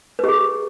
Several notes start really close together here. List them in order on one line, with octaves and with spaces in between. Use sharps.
B4 G4 G#4